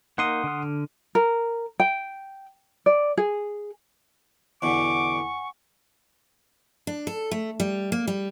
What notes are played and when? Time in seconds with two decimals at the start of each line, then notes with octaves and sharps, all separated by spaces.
0.18 A#3 D#4 A#4 F#5 C6 D#6
0.44 D3 F6
1.15 A#4
1.80 G5
2.86 D5
3.17 G#4
4.62 E2 B2 D3 F#5 G#5 C#6 D6
6.87 D4
7.07 A4
7.31 A3
7.60 G3
7.92 A#3
8.07 G3